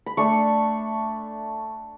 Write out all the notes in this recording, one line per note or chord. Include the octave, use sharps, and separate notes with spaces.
B5
A3 D4 C#6